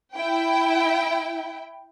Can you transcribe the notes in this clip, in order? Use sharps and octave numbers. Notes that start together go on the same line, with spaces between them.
E4 G5